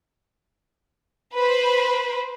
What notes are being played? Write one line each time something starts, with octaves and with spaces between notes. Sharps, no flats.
B4 C5